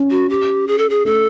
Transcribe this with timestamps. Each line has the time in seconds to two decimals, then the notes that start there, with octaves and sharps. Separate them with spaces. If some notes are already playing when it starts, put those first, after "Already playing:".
Already playing: C#4
0.10 F#4
0.30 G4
0.68 G#4
0.78 A4
0.90 G#4
1.05 A3 A4